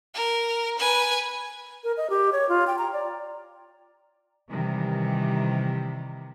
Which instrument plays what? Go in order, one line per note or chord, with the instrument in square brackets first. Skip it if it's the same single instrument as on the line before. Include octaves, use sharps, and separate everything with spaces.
[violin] A#4
B4 G#5
[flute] A#4
D#5
G4
C#5
F4
G5
A#5
D5
[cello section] C3 D#3 E3 G3